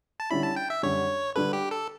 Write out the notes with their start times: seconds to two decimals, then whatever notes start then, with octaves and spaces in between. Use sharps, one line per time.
0.20 A5
0.30 D3 G3 C#4 E4 B5
0.43 A5
0.56 G5
0.70 E5
0.83 F#2 D3 G3 C#5
1.35 D3 G3 D4 A4 B4
1.53 G4
1.71 A4